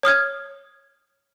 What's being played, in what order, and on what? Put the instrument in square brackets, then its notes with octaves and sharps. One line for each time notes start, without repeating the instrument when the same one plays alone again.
[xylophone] C#5 D#6 F6 G#6